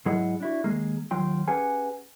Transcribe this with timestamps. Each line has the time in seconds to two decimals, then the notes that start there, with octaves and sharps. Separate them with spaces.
0.06 G#2 F#3 E4 G#4 D#5 F#5
0.40 D4 E4 F#4
0.64 D#2 G#3 A#3 G#4
1.11 D#2 F#3 F4 G5 C6
1.48 C#4 G4 G#4 B4 F#5 G#5